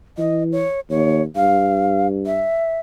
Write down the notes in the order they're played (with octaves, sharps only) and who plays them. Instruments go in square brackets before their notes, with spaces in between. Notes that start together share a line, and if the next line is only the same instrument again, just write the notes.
[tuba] E3 [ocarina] D#5
[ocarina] C#5
[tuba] D#2 [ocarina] C#5
[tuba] G2 [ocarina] F5
[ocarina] E5